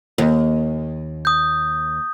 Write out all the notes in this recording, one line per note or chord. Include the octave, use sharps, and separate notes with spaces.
D#2
D#6 G6